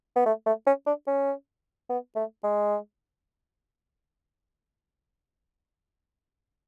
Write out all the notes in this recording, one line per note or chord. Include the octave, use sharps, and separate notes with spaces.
B3
A3
A3
C#4
D4
C#4
B3
A3
G#3